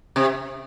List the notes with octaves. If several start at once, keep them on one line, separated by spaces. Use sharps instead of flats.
C3